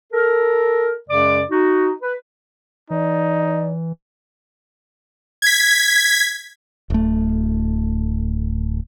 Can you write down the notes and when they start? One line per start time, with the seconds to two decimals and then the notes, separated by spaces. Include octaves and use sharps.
0.12 A4 A#4
1.09 F#2 C#3 G#3 D5 D6
1.51 D#4 F#4
2.02 B4
2.90 E3 D#4 D5
5.42 G#6 B6
6.90 D1 A3